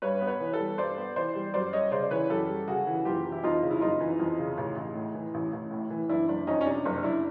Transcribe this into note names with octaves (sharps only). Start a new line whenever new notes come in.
G2 B4 C#5
B3
B4 C#5
E3
A4 B4
G3
G2 C5 D5
B3
E3 C5 D5
G3
F#2 C5 D5
G3 C#5 D#5
C#3 C5 D5
D5
E3 B4 C#5
F#2 G4 A4
G3
C#3 F#4 G#4
E3
F#1 F4 G4
E3
E4
F2 D#4 F4
C#3
E4
F#1 D#4 F4
E3
F2
C#3
A1
A1
A2
E3
A1
A1
A2
E3
F#1 D4 E4
F#1 D4
F2 C#4 D#4
C#4
C3 D4
F#1 D4
F#1 D4 E4